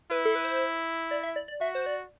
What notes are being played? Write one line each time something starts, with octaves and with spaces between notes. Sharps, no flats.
E4 B4
A4
B4
C5
D5
E5
D5
D5
F#4 E5
C5
D5